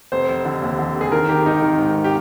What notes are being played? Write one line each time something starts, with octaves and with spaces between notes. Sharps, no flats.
F1 C5
F1
D3
D#2
D3
F1
G#4
D#3 A#4
D#3 G4
G#1 D#4
D#3
G#2
G4